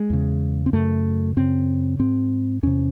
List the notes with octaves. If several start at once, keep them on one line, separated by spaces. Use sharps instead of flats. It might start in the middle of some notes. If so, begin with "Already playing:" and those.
Already playing: G#3
E2 C#3
C4
F#2 C#3 A3
F#2 C#3 C4
G#2 C4
E2 C3 C#4